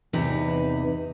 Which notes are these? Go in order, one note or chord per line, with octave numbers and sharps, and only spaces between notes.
E2 C3 D#4 B4